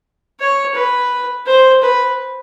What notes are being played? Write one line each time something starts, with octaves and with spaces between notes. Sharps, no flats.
C#5
B4
C5
B4